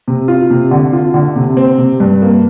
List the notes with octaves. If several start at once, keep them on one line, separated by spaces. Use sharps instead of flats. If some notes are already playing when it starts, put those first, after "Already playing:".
C3
F4
C3
D3
F4
D3
C3
C4
C3
G2
A#3